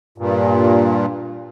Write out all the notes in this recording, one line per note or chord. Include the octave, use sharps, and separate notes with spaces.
G2 A#2